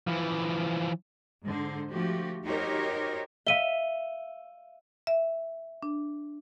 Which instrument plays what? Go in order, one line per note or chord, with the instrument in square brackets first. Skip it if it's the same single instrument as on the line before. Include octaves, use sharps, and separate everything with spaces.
[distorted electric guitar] E3 F3
[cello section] G#2 D3 C5
F3 A3 F#4 G4
D#4 F#4 G4 A#4 C5 C#5
[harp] E5 [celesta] F5 D#7 G7
[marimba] E5
D4